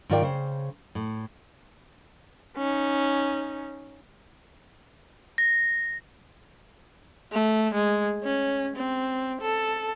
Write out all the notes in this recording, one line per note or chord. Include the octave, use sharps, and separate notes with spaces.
G#2 D#3 F4 A#4 D5 G5
C#3 C5
A2
C#4 D#4
A#6
A3
G#3
C#4
C4
A4